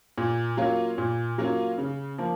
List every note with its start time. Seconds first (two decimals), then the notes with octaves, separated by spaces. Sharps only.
0.18 A#2
0.57 F#3 A#3 C#4 F4
0.98 A#2
1.38 F#3 A#3 C#4 F4
1.78 C#3
2.18 F3 A#3